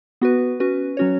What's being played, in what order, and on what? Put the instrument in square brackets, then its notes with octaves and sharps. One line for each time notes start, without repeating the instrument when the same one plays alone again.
[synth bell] B3 F#4 B4
C#4 F#4 B4
F#3 C#4 F#4 C#5